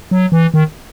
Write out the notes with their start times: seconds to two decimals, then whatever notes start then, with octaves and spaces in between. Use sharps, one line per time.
0.11 F#3
0.32 E3
0.54 D#3